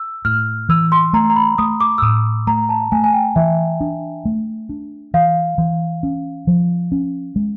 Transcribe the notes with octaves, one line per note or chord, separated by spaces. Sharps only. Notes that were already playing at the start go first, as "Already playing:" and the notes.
Already playing: E6
A2 F6
E3 E6
C6
A3 A#5
A#5
B5
A3 D#6
D6
E6
A2 D#6
A3 A#5
A5
A3 G#5
G#5
G5
E3 E5
D4
A3
D4
E3 F5
E3
C#4
F3
C#4
G#3